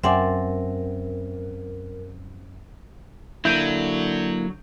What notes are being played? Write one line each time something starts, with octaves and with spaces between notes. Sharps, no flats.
F#2 C4 A#4 D5 E5 F#5 G#5
D3 F#3 A#3 E4 G6 D7 D#7